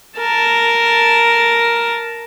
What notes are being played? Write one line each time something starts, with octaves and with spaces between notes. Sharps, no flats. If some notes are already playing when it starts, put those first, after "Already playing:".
A#4 A5